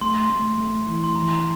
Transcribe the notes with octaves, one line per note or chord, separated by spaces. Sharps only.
A3 C6
A3
A3
E3
C6
E3 A#5